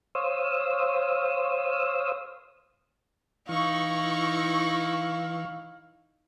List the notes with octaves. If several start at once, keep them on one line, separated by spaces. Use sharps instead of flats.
C5 C#5 F5 D#6 E6
E3 D#4 E4 F5 C#6